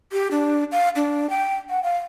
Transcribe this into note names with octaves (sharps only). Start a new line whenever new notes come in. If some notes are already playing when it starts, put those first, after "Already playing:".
G4
D4
F5
D4
G5
F#5
F5